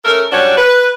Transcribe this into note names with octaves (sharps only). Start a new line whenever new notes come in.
A3 C#4 A4 A#4
F#3 G3 C#4 D4 F#4 C#5
B4